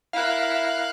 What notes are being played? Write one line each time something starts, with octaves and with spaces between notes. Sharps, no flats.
E4 A#4 F5 F#6